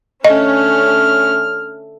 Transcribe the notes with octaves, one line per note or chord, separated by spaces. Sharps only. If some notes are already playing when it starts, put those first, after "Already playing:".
D3 A3 C#4 D#5 F6